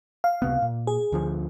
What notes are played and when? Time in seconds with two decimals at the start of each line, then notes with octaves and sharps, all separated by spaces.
0.24 F5
0.42 C#2 C3 B3
0.62 A#2
0.87 G#4
1.12 D2 D3 F3